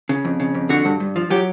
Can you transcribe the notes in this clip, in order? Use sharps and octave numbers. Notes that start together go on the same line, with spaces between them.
C#3
F2
C#3
F2
D3 F#4
G2
G2
F3
F#3 G4